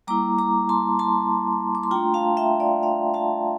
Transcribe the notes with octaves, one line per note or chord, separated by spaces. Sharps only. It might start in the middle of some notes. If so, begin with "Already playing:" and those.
G3 A#3 E4 A#5 D6
A#5 D6
A5 C6
A5 C6
D6
C6
A3 D4 F4 G5 A#5
F5 A5
E5 G5
D5 F5
D5 F5
F5 A5